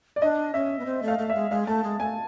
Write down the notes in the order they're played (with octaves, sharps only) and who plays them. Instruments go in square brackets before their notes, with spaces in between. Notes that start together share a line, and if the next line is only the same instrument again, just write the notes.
[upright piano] D5
[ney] D4 [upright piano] D#5
[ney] C#4 [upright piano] E5
[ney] B3
C4
A3
[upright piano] F5
[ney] A3
[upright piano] E5
[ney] G#3
[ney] G#3 [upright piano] F5
[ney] A3 [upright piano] A5
[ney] G#3
[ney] A3 [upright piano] G#5